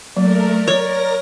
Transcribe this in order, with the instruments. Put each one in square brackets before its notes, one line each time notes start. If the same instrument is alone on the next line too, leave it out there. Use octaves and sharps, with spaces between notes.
[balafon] F#3 A#3 [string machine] A3 A#4 [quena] D5
[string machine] A#4 A#6 [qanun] C#5